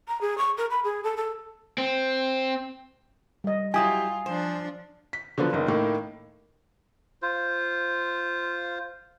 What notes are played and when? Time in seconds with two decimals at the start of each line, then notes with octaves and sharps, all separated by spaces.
0.08 A#5
0.21 G#4
0.38 C#6
0.57 A#4
0.70 B5
0.84 G#4
1.04 A4
1.17 A4
1.78 C4
3.44 G3 D#5
3.74 F#3 E4 F4 G4 G#5 D#6
4.26 F3 D4 C5
5.13 B6
5.38 D3 F3 F#3 B3
5.53 F#1 D#3
5.68 A2 D#3 A#3
7.22 F4 C5